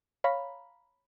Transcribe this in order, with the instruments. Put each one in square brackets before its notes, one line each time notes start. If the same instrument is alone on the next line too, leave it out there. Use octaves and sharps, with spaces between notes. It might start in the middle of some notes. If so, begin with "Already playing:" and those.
[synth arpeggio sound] C#5 F5 A#5 B5